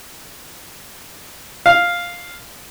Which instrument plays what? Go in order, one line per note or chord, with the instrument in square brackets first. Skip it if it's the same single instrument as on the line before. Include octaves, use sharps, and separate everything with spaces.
[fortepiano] F5